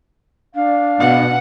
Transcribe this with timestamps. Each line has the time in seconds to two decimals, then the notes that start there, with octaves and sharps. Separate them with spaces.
0.55 D4 F5
1.00 B2 F#5